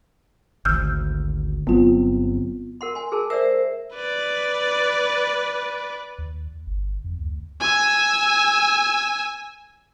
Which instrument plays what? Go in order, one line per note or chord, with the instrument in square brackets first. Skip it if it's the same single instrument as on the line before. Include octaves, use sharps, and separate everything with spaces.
[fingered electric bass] G#1 D2 [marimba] E6 F6 G6
[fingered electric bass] G1 F#3 C4 [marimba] B3 F4
[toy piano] A#4 F#5 C6
G#5 C6
G#4 A#4 A5
[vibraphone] A#4 C5 E5 [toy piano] D5 E6
[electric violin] B4 D5
[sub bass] D#2
G1
F2
D2
[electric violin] G#5 E6